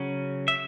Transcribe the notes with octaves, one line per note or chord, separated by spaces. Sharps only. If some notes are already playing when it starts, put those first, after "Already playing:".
Already playing: C#3 F#3 C#4
E5